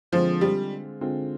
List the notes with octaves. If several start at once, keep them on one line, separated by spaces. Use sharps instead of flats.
D3 F3 G#3 C4 F4
G3
D3 G#3 C4 F4